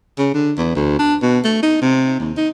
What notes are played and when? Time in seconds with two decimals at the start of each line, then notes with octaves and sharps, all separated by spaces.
0.18 C#3
0.34 D3
0.57 E2
0.76 D2
0.99 D4
1.22 B2
1.44 A3
1.62 D#4
1.82 C3
2.20 D#2
2.37 D#4